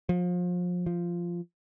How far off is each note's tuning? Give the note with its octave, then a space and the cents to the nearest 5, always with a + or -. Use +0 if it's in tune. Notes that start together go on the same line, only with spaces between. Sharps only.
F3 +30
F3 -10